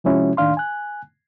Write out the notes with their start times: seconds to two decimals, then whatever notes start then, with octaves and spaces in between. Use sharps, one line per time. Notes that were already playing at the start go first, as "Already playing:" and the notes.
0.04 C3 F3 G#3 C#4 E4 F#4
0.37 D#2 A2 D#3 D4 F5 C6
0.57 G#5 F#6